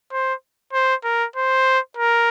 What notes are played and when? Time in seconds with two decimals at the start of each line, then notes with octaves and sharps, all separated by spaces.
0.12 C5
0.73 C5
1.04 A#4
1.36 C5
1.97 A#4